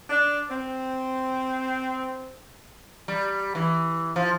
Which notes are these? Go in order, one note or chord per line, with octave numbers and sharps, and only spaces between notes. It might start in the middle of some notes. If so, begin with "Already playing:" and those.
D4
C4
G3
E3
F3